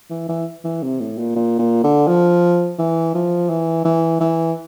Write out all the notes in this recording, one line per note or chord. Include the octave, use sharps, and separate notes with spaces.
E3
E3
E3
C3
A2
A#2
A#2
A#2
D3
F3
E3
F3
E3
E3
E3